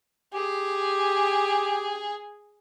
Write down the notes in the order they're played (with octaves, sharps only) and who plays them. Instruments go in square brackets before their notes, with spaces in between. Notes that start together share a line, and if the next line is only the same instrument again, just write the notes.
[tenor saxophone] G4 [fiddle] G#4